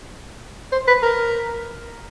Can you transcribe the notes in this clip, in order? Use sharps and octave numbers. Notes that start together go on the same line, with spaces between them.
C5
B4
A#4